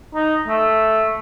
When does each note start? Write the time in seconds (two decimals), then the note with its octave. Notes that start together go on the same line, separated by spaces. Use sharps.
0.15 D#4
0.47 A3